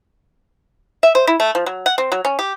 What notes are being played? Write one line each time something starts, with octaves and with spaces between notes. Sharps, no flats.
E5
C5
E4
A3
F3
F#3
F#5
C4
F#3
C#4
G4